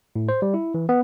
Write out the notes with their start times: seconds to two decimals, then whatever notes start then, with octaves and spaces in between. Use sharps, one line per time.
0.16 A2
0.29 C5
0.42 G3
0.54 E4
0.74 E3
0.89 B3